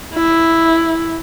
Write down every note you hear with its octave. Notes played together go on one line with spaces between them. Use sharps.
E4